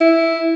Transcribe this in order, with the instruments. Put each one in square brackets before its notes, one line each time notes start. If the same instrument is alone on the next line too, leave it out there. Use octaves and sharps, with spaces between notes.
[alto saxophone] E4